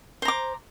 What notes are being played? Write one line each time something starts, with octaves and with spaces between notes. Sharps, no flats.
C5 A#5 D6